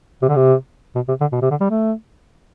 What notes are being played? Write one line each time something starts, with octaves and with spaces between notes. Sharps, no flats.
C3
D3
C3
B2
C3
D3
B2
C3
D3
G3
A3